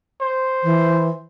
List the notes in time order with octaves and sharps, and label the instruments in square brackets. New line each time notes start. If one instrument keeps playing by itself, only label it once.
[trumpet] C5
[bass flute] E3